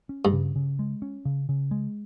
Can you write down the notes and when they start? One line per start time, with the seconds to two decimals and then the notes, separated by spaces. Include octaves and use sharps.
0.09 C#4
0.25 G2
0.33 C#3
0.56 C#3
0.79 G#3
1.02 C#4
1.25 C#3
1.49 C#3
1.71 G#3